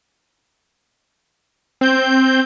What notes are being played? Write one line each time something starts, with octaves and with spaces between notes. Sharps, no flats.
C4 G6